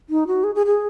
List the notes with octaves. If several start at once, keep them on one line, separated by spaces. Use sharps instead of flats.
D#4
F#4
G#4
G#4
G#4